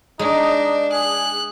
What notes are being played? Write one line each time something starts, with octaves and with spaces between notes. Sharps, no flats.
G#3 D4 D#4
G#4 F#6